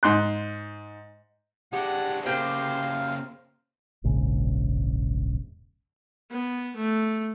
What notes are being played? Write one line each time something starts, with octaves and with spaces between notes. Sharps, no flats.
G#2 C6 F#6
G#3 D4 G4 F#5
C#3 A#3 G4 C5 F5 G5
E1 A#1 G#2 C#3
B3
A3